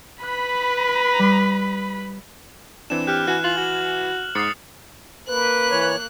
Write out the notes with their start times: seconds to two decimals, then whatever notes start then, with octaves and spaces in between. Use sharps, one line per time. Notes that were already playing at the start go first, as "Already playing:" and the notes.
0.23 B4 B5 F#6
1.19 G3 D#6
2.90 E3 C4 D4 E7
3.07 G4 F6 F#6
3.27 E3 F#4 G#5 F#6
3.44 F4 F#7
3.57 F#4
4.35 G#2 D#6 A6 C7 C#7
5.29 A#3 B4 F#6
5.71 E3 C#5